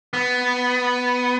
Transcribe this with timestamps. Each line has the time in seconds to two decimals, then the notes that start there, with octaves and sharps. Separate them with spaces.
0.13 B3